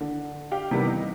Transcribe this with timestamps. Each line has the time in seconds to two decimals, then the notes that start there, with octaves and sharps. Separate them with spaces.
0.01 D3
0.52 G4 F5 G5
0.71 C3 D#3 E3 G3 B3
0.87 D#4